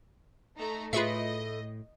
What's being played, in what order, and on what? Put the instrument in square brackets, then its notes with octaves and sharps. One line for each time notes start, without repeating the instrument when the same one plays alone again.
[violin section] A3 D#4 A#5
[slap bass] A2 [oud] A3 B4 [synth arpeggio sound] F4 G#4 E5 [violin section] D#5